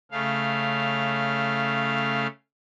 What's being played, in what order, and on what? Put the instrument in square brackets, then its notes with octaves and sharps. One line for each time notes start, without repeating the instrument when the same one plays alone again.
[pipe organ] C#3 A3 F5